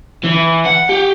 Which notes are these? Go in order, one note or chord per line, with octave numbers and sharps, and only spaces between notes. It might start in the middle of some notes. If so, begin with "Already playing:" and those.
E3
F#5
G4